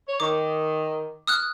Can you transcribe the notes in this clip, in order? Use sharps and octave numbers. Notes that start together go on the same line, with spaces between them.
C#5
D#3 D6
D#6 F6 F#6